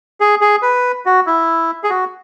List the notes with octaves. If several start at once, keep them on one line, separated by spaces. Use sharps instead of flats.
G#4
G#4
B4
F#4
E4
G#4
F#4